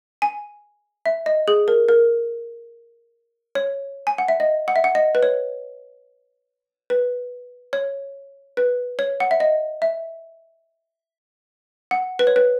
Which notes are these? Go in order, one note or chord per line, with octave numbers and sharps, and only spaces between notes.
G#5
E5
D#5
G#4
A#4
A#4
C#5
G#5
F#5
E5
D#5
F#5
E5
F#5
D#5
B4
C#5
B4
C#5
B4
C#5
F#5
E5
D#5
E5
F#5
B4
C#5
B4